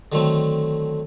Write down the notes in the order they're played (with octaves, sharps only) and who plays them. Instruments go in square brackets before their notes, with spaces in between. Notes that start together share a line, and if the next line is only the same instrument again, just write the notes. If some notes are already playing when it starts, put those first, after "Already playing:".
[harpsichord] D3 D#3 F#3 A3 C4